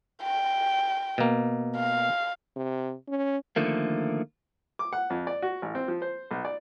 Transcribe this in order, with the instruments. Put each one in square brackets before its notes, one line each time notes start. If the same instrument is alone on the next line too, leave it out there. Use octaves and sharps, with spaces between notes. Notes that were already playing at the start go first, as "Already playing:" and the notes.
[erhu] G5
[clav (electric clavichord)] B2 A#3
[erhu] F5
[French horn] C3
C#4
[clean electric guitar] D3 D#3 F3 A3 A#3
[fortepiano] D6
F#5
F2
D5
F#4
A1
C4
F3
C5
B1
D5